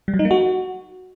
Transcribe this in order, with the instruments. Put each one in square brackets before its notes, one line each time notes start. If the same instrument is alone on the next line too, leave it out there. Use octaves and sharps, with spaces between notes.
[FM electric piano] G3
F#3
D#4
A#3
F#4